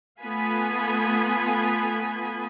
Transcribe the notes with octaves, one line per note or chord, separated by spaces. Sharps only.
A3 B3 F4 G#5 B5